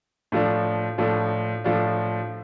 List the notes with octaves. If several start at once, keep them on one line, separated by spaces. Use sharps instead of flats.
A2 F3 D4
A2 F3 D4
A2 F3 D4